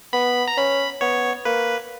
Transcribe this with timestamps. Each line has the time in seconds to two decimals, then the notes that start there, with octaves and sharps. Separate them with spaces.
0.13 B3 B5
0.48 A#5
0.57 C#4 B5
1.01 B3 C#5
1.45 A#3 B4